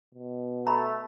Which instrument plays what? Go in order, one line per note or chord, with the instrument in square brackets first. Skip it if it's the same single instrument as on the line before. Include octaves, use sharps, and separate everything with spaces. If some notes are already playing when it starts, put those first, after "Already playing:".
[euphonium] B2
[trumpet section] A3 [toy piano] A#5 B5